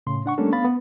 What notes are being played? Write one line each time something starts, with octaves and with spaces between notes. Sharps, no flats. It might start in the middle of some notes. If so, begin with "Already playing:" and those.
A2 C#3 C6
D4 F#5 C#6
G3 A3 A#3 C#4 D4 A4
B3 F5 B5 A6
B3